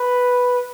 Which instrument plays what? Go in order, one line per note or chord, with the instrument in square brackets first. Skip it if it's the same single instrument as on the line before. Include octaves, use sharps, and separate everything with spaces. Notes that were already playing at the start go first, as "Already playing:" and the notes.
Already playing: [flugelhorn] B4